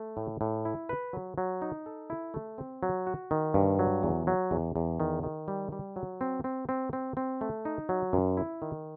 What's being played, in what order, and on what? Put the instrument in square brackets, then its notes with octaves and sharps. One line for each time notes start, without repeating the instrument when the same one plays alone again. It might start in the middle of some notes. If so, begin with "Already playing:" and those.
Already playing: [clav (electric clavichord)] A3
A2
A2
E4
B4
F#3
F#3
D#4
A4
E4
A3
C4
F#3
F#4
D#3
G2
F#3
E2
F#3
E2
E2
D#3
D#3
G3
G3
F#3
C4
C4
C4
C4
C4
A3
D#4
F#3
F#2
E4
D#3